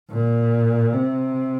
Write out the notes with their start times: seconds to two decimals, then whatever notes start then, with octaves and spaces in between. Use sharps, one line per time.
0.11 A#2
0.93 C3